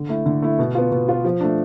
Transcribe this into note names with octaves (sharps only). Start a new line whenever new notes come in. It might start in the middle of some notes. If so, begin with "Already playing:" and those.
Already playing: D3
A3 E4
D3
A3 E4
B2
B3 F4
B2
B3 F4
F3
A3 D4